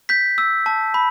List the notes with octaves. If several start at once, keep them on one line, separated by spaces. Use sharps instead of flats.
G6 B6
E6
A5
B5